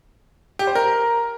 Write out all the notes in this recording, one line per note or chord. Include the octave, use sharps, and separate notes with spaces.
G4
C5
A#4